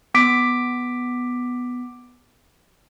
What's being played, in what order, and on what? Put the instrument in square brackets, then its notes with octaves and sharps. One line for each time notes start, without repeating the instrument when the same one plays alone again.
[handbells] B3 D6 B6 D7